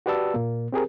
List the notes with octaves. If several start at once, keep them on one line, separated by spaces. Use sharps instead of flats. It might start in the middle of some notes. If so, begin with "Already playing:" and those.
F#4 G4 B4 D5 A5 E6
A#2 A#3
C4 G4 G#4 A#4